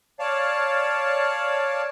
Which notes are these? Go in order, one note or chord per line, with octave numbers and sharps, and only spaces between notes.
C#5 D5 F5 A5